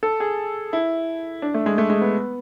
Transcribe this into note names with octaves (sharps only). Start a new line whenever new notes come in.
A4
G#4
E4
D4
A3
G#3
A3
G#3
B3